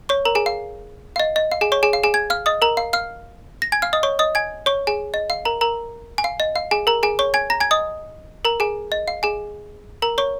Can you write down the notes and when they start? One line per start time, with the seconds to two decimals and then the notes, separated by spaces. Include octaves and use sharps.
0.09 C#5 C#6
0.25 A#4 A#5
0.35 G#4 G#5
0.46 F5
1.16 F5
1.20 D#5
1.36 D#5
1.52 F5
1.61 G#4 G#5
1.72 C#5 C#6
1.83 G#4 G#5
1.93 F5
2.03 G#4 G#5
2.14 G#5 G#6
2.30 F5 F6
2.46 D#5 D#6
2.62 A#4 A#5
2.77 F5
2.93 F5 F6
3.62 A#6
3.72 G#5 G#6
3.82 F5 F6
3.93 D#5 D#6
4.03 C#5 C#6
4.19 D#5 D#6
4.35 G#5 G#6
4.66 C#5 C#6
4.87 G#4 G#5
5.14 D#5
5.30 F5
5.45 A#4 A#5
5.61 A#4 A#5
6.18 G#5
6.24 F5
6.40 D#5
6.56 F5
6.71 G#4 G#5
6.87 A#4 A#5
7.03 G#4 G#5
7.19 C#5 C#6
7.34 G#5 G#6
7.50 A#5 A#6
7.60 G#5 G#6
7.71 D#5 D#6
8.45 A#4 A#5
8.60 G#4 G#5
8.92 D#5
9.08 F5
9.23 G#4 G#5
10.02 A#4 A#5
10.18 C#5 C#6